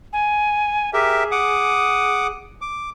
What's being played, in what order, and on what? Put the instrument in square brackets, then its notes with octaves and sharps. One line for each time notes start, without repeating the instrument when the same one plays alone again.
[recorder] G#5
[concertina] G4 A#4 E5 [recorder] G#4
[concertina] F#5 D6 D#6
D6